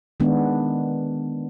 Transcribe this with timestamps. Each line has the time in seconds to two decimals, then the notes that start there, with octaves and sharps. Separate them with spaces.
0.20 D#3 G#3 B3 D4